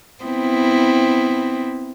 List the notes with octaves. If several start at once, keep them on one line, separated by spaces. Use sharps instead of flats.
B3 C4 E4